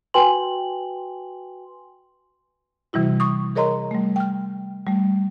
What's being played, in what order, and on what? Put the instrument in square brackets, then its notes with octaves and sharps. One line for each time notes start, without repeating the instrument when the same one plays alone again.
[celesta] F#4 B4 G5 G#5 C6 F#7
[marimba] C3 E3 G3 E4 F#4
C#6 D#6
G#4 A#4 C#5 D#5 A#5 C6
G3 A3
G5 F6
G3 A3